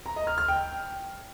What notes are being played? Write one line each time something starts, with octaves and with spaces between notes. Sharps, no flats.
A#5
D#5
F6
F6
G5